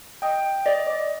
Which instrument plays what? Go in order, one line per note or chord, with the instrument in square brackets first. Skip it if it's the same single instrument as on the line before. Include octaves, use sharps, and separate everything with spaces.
[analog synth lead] D#5 [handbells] G5
[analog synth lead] D5 [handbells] D#5
[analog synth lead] D5